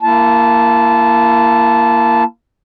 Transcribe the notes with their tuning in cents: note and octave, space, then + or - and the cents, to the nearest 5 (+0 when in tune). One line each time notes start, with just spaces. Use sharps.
A#3 +0 E4 +35 A5 -10